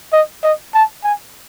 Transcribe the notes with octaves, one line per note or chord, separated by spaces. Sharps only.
D#5
D#5
A5
G#5